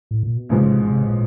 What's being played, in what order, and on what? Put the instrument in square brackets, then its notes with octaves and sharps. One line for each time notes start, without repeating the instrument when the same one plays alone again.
[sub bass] A2
A#2
B2
[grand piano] A1 G#2 F3 G#3 [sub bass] C3
[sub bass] C#3
C3
B2
C3
A#2